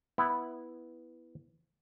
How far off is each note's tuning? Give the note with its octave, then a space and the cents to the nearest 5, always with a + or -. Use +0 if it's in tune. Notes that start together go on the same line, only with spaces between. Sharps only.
B3 +0 E4 +0